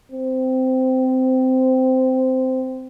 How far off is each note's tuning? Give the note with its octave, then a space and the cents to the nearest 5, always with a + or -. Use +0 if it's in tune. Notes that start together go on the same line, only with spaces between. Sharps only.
C4 -15